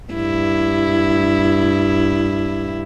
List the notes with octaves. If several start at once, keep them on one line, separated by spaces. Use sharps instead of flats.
G2 E4